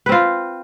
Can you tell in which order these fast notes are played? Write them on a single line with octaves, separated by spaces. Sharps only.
B4 C4 F4